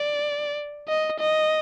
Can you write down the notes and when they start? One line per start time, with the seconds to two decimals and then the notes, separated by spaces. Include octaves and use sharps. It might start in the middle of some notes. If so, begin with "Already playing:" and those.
Already playing: D5
0.88 D#5
1.20 D#5